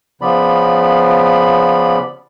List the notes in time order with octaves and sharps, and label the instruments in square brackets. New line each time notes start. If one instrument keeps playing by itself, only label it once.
[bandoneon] C#3 F3 B3 D5 B5